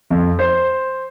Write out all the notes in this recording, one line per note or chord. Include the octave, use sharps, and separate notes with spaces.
F2
C5